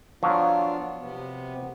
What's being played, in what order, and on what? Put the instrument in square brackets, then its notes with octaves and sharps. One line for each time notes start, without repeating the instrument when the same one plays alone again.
[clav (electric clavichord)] F3 F#3 [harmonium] B3 D4 F4
[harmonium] C3 B3